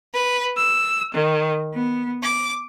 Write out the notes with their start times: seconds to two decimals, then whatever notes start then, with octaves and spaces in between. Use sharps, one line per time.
0.13 B4
0.58 E6
1.14 D#3
1.74 B3
2.22 D6